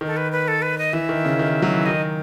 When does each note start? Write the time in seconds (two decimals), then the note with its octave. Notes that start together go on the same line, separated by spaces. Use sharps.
0.01 D#3
0.06 A4
0.17 B4
0.32 B4
0.48 A4
0.62 B4
0.78 D#5
0.93 E3 E5
1.09 D#3
1.25 C#3
1.39 D#3
1.62 F#3
1.74 E3
1.86 D#3 D#5